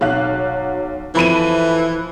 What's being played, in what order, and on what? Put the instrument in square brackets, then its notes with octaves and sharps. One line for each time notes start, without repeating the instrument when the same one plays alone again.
[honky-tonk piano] B1 F5 F#6 [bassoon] F#3
[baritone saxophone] E3 [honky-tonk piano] F3 B5 D#7 [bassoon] A3